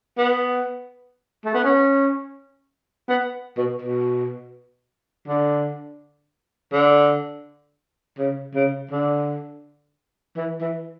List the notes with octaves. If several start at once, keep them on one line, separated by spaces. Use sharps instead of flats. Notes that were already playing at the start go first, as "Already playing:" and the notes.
B3
A3
B3
C#4
B3
B2
B2
D3
D3
C#3
C#3
D3
E3
E3